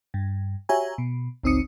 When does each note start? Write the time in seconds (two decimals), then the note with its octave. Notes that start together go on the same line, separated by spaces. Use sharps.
0.14 G2
0.69 F#4 G4 C#5 E5 G#5 A#5
0.98 B2
1.44 G1 C#2 C4 D#4 D#6 C#7